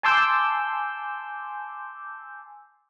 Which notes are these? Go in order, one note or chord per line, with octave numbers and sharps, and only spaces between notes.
G#5 A5 C6 D6 E6 G6